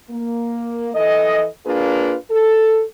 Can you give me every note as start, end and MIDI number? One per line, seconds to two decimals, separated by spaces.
0.10 0.90 58
0.94 1.46 52
0.94 1.46 69
0.94 1.46 75
1.65 2.14 58
1.65 2.14 62
1.65 2.14 65
1.65 2.14 68
1.65 2.14 71
2.30 2.83 69